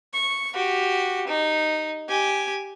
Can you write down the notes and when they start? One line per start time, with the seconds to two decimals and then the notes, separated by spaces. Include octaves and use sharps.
0.13 C#6
0.55 F#4 G4
1.28 D#4
2.09 G4 G#5